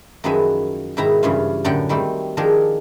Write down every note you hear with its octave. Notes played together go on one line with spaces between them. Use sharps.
F#2 D#3 F3 G#4 B4 E5
G#2 B2 D#3 E4 E5 A#5
G2 C#3 E3 C#4 F4
F#2 A2 D3 F#5 G5
D#3 G3 A3 C4
D#3 F3 D4 G#4 A#4